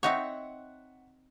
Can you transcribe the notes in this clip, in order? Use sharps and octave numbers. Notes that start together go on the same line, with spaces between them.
C4 D#4 C#5 E5 F#5 C#6